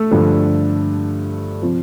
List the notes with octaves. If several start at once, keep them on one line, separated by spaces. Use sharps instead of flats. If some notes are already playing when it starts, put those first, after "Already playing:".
Already playing: A3 A4
G2 D3 F3
C3 F3